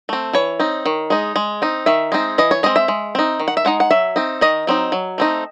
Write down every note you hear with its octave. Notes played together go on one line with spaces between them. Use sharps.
A3 C4
E3 C#5
C4 D#4
D#3
G#3 D#4
G#3
C4 D#4
D#3 E5
G#3 C4 D#4
E3 D#5
C#5
G#3 C4 D#5
E5
G#3
C4 D#4
D#3
F#5
E5
G#3 D#4 F#5
F#5
F#3 E5
C4 D#4
D#3 D#5
F#3 C4 D#4
F#3
A3 C4 D#4